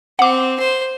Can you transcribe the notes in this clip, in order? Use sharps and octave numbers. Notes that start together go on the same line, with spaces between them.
C4 F#5 D6
C5